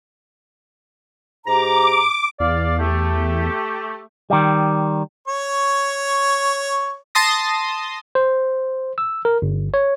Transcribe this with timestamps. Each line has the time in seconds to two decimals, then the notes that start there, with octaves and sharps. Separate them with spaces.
1.47 G#2 G4 A#5 D6
2.40 E2 D5 F5
2.79 A3 G4
4.30 D#3 G3
5.28 C#5 C#6
7.15 A5 C6 D#6 A#6
8.15 C5
8.98 E6
9.25 A#4
9.42 G1
9.74 C#5